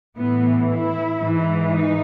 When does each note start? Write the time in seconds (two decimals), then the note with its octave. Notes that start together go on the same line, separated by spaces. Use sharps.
0.17 A2 E3 B3
0.69 E4
1.21 G#2 E3
1.72 D#4